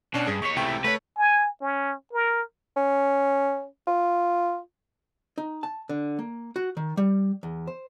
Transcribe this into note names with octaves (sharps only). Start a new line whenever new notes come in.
B2 C#4 D4
G2 G#4
D#2 C#5 C#6 B6
C#2 C3 E3 A3 G5
A3 B4 C#5
G#5
C#4
A#4
C#4
F4
D#4
A5
D3
A#3
F#4
D#3
G3
E2
C5